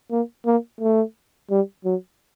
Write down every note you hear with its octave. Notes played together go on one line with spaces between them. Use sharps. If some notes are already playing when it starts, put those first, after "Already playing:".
A#3
A#3
A3
G3
F#3